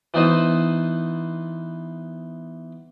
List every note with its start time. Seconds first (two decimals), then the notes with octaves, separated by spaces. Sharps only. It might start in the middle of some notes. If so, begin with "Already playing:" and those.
0.14 E3 B3 D#4 C5 D#5